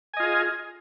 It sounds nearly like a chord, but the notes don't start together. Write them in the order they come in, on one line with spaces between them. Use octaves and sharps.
G#5 D#5 F4 G#4